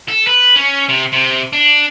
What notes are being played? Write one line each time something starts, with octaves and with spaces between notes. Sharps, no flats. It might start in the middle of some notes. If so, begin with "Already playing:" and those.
A4
B4
C#4
C3
C3
D4